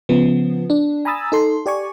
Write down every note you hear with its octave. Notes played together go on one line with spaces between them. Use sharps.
C#3 F3 B3
D4
G#5 A#5 B5 D#6 E6 A6
D#4 A4 C6
G4 D5 G#5 C#6